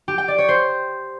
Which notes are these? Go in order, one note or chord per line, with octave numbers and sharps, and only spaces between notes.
G4
G5
D5
C#5
C5